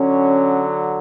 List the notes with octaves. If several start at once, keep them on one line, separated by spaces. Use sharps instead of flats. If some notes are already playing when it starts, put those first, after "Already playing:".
Already playing: D3 F#3 C#4